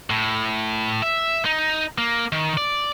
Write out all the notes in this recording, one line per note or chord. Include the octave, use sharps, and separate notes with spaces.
A2
E5
D#4
A#3
D#3
D5